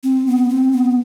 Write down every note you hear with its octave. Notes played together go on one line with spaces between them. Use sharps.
C4
B3
C4
B3